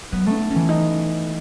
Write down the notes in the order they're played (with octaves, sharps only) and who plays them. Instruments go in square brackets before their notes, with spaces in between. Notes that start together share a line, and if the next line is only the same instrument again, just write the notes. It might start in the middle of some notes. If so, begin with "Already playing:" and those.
[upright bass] F#3 [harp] B3
[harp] A3
[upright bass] D#4
[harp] E3 [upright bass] C#4
[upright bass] D#4